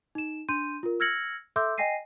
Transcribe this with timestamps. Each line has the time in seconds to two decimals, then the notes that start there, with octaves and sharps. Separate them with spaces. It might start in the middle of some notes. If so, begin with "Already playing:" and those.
0.15 D#4 E7
0.49 D4 C6 G6 D#7
0.83 F4 A#4
1.00 E6 F6 G#6 A#6 C#7 F#7
1.56 A4 E5 C6 D6 E6 G6
1.78 D#5 G5 G#5 A#6 C7 D#7